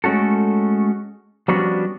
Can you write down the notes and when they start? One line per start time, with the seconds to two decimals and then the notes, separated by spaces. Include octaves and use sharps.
0.04 G#3 A3 C#4 F#4 A4
1.48 F3 G3 B3 C#4 D4 F#4